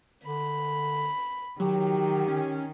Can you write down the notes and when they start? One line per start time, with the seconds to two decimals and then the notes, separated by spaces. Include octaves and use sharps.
0.24 D3 B5
1.60 D#3 F#3 G4
2.28 C#4